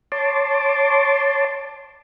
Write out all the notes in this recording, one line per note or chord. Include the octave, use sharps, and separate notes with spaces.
C#5 A5 C6 D6